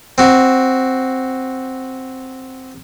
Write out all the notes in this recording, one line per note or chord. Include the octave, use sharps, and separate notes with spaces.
C4 F#4